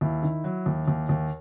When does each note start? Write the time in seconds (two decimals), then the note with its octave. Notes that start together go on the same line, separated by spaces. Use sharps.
0.01 D#2 E4
0.23 D#3
0.44 F#3
0.66 D#2
0.88 D#2
1.09 D#2